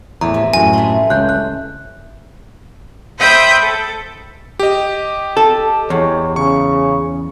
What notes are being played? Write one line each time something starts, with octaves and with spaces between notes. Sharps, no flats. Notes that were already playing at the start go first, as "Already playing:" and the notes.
E2 A2 E3 A#5
C3
F#2 A2 G#5
G#3 A3
C#2 F#6 G6
F#6
C5 E5 G5 B5 D#6 G6
A4
G4 D#5
A4
E2 C#5
C#3 C#6